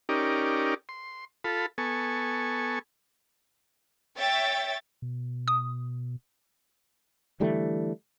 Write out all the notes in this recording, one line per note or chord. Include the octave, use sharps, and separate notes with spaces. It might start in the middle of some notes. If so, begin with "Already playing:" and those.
C#4 D#4 G4 A#4 D5
C6
F4 A4 B5
B3 A4 G#5 C#6
C#5 E5 G5 A6
B2
D#6
D3 E3 G3 A3